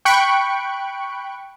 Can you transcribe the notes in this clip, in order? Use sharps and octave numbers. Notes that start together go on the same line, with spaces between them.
G5 B5 C#6 F#6 C#7 D7